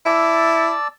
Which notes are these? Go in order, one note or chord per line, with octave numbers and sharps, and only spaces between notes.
E4 D5 A5 E6